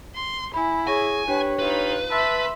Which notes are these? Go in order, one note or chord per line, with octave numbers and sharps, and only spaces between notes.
C6
E4 G#5 B5
G#4 C#5 G#5 C#6 A#6
D4 G4 B4 C#5 G5
D#4 F4 B4
E5 A5 B5 C6 E6 A6